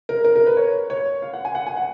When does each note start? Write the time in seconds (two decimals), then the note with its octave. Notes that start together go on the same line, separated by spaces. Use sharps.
0.09 A#4
0.24 A#4
0.36 A#4
0.46 B4
0.57 C#5
0.90 C#5
1.22 F5
1.33 F#5
1.45 G#5
1.55 F#5
1.67 G#5
1.76 F#5